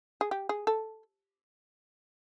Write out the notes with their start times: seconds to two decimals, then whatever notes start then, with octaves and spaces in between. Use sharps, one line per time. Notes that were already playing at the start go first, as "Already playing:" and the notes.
0.21 G#4
0.31 G4
0.49 G#4
0.67 A4